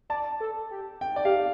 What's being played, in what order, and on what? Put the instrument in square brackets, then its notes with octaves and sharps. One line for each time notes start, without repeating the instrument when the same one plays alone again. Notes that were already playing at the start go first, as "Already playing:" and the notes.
[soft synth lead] D5 [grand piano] A5
[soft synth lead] A4
G4
[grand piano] G5
D5
[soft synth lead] G4 [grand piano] F5